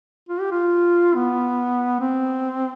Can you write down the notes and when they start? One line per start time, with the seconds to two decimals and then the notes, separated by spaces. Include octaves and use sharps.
0.29 F4
0.40 G4
0.51 F4
1.15 B3
2.01 C4